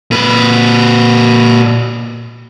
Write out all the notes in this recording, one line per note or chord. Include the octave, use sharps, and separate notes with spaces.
A#2 B4